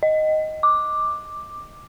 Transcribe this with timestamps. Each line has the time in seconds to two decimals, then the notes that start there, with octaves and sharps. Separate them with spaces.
0.03 D#5
0.63 D6